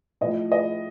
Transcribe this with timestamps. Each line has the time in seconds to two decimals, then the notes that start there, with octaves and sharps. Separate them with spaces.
0.21 A2 F3 D#5
0.52 D#5